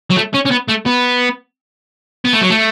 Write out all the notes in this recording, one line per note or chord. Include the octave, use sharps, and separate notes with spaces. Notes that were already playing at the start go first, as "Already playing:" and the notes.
F#3
A3
C#4
C#4
B3
A3
B3
B3
A3
F#3
A3